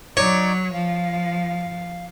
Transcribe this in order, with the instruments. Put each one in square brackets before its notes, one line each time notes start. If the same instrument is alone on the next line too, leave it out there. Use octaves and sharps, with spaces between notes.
[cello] F#3 [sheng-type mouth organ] D#4 D5 D6 [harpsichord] C#5
[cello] F3 [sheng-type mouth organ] F5